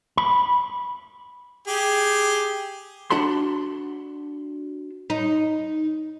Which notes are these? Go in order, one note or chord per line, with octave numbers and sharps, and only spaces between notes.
B5
G4 G#4
D4 F#4 A5 B5 C6
D#4